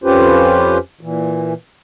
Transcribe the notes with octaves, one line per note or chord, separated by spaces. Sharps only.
F2 C#4 F4 G4 B4 C5
A#2 E3